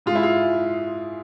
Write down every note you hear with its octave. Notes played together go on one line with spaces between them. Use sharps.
G#2 G#3 F4
E4
F4